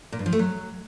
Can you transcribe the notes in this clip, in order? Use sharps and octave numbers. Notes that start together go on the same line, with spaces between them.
A#2
G2
F3
A3
F#3